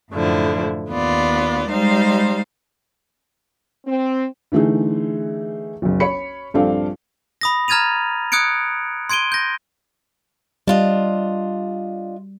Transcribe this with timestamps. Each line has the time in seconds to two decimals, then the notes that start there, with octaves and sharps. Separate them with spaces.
0.12 F#2 A2 D3 F3 E4
0.91 D#2 B3 F4 D5
1.70 G3 G#3 D#4 C5 F5
3.85 C4
4.52 D3 E3 A3 D#4 G#4
5.82 F#1 B1
6.00 C#5 B5 C#7
6.54 A#1 G2 C4 D4 A4 F5
7.41 B5 D#6 A#6
7.68 A#5 F6 G#6 A6 D#7 F7
8.32 D#6 F#6 G#6 C#7 D7
9.10 C6 G#6 D7 D#7 G7
9.32 G6 A#6
10.67 G3 D4 F4 D#5